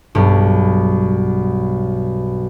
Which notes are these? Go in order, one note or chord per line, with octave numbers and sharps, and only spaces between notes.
B1 G2